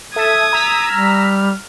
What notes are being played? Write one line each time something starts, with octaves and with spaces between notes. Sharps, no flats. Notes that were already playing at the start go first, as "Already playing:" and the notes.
A4 E5 D#6 G#6
A#5 E6 B6
G3 F6